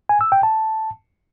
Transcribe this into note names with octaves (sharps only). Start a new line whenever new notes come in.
G#5
E6
G5
A5